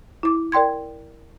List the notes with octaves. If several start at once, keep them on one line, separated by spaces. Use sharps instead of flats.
E4 D6
A#4 D5 G5 C6 G#6